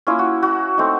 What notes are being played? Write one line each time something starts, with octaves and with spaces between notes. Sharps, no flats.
A#3 C#4 E4 F4
F#4
F#4
A3 C4 D#4